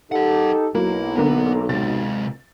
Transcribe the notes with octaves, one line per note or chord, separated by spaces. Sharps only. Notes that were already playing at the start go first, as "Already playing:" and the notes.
D#4 G4 A4 A#4 F#5
B1 F#3 A#3 E4
D3 A#3 B3 A#5
C3 G#3 A6